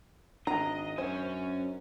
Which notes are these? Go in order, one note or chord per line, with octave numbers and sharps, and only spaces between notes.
G#1 D4 D#5 A#5
F#2 C#4 C5 G#5